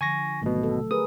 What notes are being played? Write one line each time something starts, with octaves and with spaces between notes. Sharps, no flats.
D3 F3 G#5 C#6 A#6
G#1 B2 F#3 A3
A4
G#4 A#4 B4 D#6